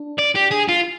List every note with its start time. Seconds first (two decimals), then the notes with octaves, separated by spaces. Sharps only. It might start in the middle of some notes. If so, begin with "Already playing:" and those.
Already playing: D4
0.18 D5
0.35 G4
0.51 G#4
0.68 F4